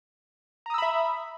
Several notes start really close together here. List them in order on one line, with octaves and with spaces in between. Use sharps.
A#5 D#6 E6 B5 E5